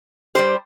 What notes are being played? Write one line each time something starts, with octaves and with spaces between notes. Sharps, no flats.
G2 G3 A#3 G4 C5